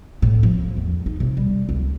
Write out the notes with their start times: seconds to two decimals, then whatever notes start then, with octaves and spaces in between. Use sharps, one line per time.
0.22 A2
0.43 F3
0.77 E2
1.06 D#4
1.20 C3
1.37 G3
1.69 C#2